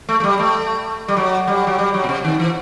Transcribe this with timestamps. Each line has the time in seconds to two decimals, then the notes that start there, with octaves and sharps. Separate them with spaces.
0.09 A3
0.20 A3
0.24 G3
0.39 A3
1.08 G3
1.17 F#3
1.47 G3
1.67 F#3
1.78 G3
1.94 F#3
2.04 B2
2.09 C3
2.25 D#3
2.40 E3